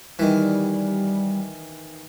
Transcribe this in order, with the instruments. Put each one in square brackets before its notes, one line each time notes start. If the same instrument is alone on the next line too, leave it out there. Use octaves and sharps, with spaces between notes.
[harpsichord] D#3 E3 [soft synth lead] G3